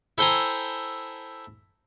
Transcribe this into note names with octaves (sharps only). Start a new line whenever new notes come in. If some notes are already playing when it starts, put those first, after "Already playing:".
E4 A4 C5 G5 G#5 A#5